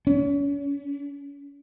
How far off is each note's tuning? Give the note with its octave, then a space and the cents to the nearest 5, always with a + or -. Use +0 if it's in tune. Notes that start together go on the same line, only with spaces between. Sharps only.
C#4 +35